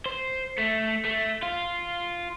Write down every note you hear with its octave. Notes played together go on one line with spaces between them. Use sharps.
C5
A3
A3
F4